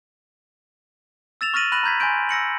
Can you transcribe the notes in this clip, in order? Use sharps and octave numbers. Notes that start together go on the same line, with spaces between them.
E6 A6 E7 F7
C#6 F6 A6 A#6 D#7 F#7
B5 F#6 A#6 D#7 F#7
A#5 B5 G6 G#6 B6
G#5 B5 C6 G6 D7
E6 A#6 C#7 F#7